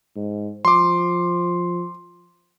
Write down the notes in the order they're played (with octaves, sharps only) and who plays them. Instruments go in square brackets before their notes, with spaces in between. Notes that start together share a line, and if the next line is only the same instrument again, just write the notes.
[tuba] G#2
[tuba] F3 [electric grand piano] C6 D6